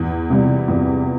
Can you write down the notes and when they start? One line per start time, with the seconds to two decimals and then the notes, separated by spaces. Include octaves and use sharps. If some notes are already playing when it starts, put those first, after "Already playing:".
Already playing: E2
0.30 C3 G3
0.68 E2